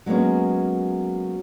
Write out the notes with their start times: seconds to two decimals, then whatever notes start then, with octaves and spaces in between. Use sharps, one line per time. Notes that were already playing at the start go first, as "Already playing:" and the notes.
0.06 F#3 G#3 A#3 B3 C#4